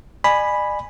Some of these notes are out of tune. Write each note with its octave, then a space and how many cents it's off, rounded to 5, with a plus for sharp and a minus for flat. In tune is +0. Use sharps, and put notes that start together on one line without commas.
D5 +45 G#5 +0 B5 +0